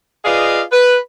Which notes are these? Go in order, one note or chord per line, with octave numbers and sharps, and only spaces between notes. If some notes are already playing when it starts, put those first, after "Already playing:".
F4 G#4 B4 D5 D#5 F5
B4